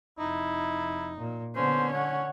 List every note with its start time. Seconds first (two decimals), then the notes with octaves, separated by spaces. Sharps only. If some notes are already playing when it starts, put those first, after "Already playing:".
0.18 F1 D#4 E4
1.18 A#2
1.56 D3 B3 C#4 C5
1.93 C#4 C#5 F#5